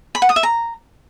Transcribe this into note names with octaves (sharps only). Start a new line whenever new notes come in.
B5
F#5
D#6
E5
A#5